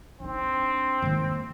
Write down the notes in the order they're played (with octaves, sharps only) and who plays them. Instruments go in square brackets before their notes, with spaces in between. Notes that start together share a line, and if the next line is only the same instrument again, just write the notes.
[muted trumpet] C4 [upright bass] D4 D#4
[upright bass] D#3 A#3